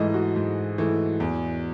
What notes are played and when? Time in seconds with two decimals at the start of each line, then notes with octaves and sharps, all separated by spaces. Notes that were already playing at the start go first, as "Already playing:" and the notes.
Already playing: G#2 E3 A3 D#5
0.14 F#4
0.36 G#2
0.78 E3 A3
1.20 E2